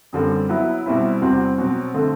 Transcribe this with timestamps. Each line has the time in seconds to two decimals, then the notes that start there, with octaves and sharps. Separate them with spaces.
0.13 F#2 D3 G3 C4
0.49 F#3 B3 E4
0.86 B2 G3 C4 E4
1.22 E2 C3 G3 C4 F#4
1.58 B2 F#3 C4
1.94 D3 A3 C4